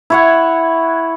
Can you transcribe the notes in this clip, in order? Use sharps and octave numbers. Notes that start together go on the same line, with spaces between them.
E4 C#5 F#5